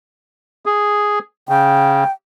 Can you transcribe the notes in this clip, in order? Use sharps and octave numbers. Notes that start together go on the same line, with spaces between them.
G#4
C#3 G5